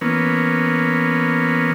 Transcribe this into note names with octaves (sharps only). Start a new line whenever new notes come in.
E3 A#3 B3 C#4